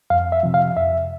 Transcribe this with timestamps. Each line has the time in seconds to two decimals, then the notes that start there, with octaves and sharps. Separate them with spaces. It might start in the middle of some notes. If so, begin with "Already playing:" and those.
0.10 F2 F5
0.32 E5
0.43 C3 F3
0.54 F5
0.77 F2 E5